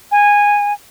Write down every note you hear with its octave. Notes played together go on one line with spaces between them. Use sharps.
G#5